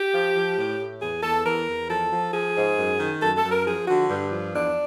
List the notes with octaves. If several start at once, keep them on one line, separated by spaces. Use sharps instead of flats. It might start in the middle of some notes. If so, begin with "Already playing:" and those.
Already playing: G4
F3
F3
A2
A2
E2 G#4
E2 A4
E2 A#4
E2
F3 A4
F3
F3 G#4
G#2
F#2
D#3
F#2 A4
A4
F#2
A#4
F3 G#4
D3 F#4
G2
F3
E2 D4